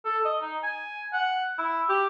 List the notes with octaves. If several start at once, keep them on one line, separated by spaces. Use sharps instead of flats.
A4
D#5
D#4
G#5
F#5
E4
G4